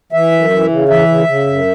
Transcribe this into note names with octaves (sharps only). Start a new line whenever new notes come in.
E3 E5
F#2
E3
C#3
E3 E5
C#3
C#3
F#2